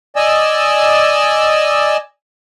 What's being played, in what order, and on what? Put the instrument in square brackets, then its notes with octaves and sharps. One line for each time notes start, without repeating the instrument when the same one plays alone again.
[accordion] D5 D#5 G#5 E6